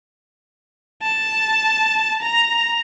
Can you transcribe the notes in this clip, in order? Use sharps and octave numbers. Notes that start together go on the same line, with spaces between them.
A5
A#5